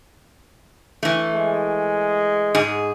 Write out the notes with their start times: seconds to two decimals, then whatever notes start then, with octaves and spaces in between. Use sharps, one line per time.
1.03 E3 A3
1.34 G#3
2.55 G#2 G#4